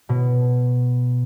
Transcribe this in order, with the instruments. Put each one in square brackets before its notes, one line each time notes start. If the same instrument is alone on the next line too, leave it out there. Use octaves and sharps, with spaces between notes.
[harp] B2